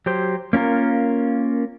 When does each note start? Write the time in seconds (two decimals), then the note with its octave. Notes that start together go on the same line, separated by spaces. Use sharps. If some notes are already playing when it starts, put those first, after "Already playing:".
0.06 F#3 G4 C5
0.53 A#3 C#4 F4 A#4